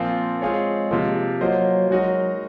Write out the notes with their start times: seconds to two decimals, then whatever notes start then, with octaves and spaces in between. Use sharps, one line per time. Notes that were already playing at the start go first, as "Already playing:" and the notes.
Already playing: A#2 F3 A#3 C4 F4
0.42 G#3 C4 F4 G#4 C#5
0.91 C3 F3 A#3 F4
1.41 F#3 A#3 F4 C5 D#5
1.90 F#3 G#3 D#4 F#4 A#4 D#5